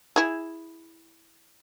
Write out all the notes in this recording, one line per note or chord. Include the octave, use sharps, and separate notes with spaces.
E4 G#4